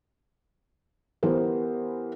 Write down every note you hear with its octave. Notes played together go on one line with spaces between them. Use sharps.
E3 B3 G4 A#4 C5